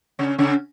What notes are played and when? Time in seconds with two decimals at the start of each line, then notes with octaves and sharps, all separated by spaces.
0.19 C#3 C#4
0.38 C#3 C#4